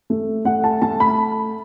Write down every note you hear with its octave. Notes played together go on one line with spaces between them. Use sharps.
A3
A3 F#5
A5
A3 A5
B5